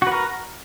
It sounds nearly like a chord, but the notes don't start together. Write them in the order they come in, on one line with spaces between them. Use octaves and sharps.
F#4 B4 A#4